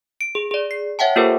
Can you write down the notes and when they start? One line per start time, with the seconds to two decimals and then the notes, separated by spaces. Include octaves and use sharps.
0.21 D7
0.35 G#4
0.51 G#4 D5
0.71 C7
0.99 C#5 E5 F#5 G5 A5
1.16 A#3 F4 G4 A4 A#4 C5